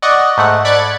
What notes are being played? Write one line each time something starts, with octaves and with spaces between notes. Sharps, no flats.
D5 D#5 F#5 C#6
G#2 A3 F#5
D5 B5 F#6 G#6 A6 C#7